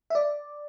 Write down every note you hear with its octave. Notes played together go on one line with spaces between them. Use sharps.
E5
D5